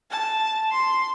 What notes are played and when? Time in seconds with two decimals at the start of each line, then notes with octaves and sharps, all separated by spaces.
0.10 A5
0.71 C6